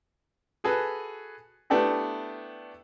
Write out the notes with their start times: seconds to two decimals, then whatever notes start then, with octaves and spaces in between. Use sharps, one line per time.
0.64 F#4 G#4 A4 B4
1.70 A3 B3 D4 E4 G4 A4